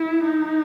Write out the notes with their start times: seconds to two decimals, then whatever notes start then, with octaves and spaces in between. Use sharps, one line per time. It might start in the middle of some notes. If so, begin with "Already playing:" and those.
Already playing: E4
0.23 D#4